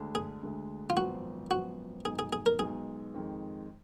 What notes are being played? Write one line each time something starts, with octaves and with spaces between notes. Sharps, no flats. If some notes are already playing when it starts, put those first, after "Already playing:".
Already playing: D2 D3 G#3 D4
G#4
D2 D3 G#3 D4
F4
G#1 F#2 F3 B3 F#4
G#1 F#2 F3 B3 F#4
B1 B2 G#3 D#4 G#4
G#4
G#4
A#4
B1 B2 G#3 D#4 G#4
F2 D#3 G#3